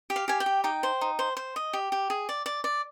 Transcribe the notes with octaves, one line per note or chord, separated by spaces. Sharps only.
G4
F5
G4 G#5
G5
G4
D#4 G5
C5
D#4
C5
C5
D#5
G4
G4
G#4
D5
D5
D5